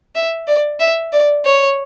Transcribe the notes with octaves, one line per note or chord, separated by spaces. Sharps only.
E5
D5
E5
D5
C#5